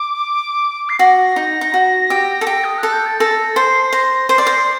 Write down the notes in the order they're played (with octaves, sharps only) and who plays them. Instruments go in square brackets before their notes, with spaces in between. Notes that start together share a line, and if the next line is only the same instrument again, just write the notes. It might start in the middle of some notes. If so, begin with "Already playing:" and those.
Already playing: [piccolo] D6
C7
[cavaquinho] F#4 [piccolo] A#6
[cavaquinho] D#4
D#4
F#4
G4
A4
G4
[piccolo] D#6
[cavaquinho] A4 [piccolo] F#6
[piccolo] G6
A6
[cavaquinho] A4 [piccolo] A#6
[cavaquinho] C5 [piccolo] C7
[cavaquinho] C5 [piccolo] A#6
[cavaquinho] C5 [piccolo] C7
[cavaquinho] D5
C5